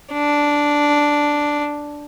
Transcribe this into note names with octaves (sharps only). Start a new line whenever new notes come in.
D4